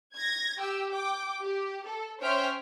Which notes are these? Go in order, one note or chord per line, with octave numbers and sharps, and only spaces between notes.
G#6 A#6
G4 G5 E6
G5 D6
G4
A4
C#4 C5 C#5 E5 G5 F6